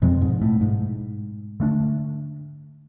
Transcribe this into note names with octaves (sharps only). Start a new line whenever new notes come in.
F2 B2 G#3 C4
G#2
A2
G#2
D3 A3 D4